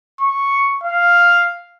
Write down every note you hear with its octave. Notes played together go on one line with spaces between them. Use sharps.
C#6
F5